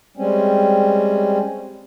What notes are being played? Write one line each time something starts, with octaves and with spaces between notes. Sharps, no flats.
G3 G#3 C4 C#4